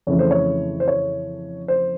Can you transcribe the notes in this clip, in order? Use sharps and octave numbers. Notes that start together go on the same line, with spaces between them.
F2 C#3 E3 A3 C#5
C5
C#5
C5
C#5
C5